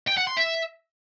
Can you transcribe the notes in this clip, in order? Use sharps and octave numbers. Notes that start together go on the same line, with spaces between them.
G5
F#5
C6
E5